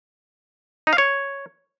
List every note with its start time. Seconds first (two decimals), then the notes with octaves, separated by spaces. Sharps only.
0.87 D#4
0.93 F5
0.98 C#5